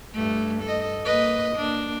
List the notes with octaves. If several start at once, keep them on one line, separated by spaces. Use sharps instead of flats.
G2 A3
A4 D#5
A#3 B4 D#5
A#3 D4